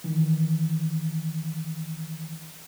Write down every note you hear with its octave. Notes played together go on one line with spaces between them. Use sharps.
D#3 E3